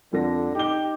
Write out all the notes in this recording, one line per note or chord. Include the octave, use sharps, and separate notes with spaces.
F2 D3 A4 A#6
D#4 G4 G7